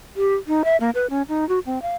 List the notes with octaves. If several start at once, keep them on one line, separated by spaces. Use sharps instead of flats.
G4
D#4
E5
A#3
B4
C#4
D#4
F#4
C4
F5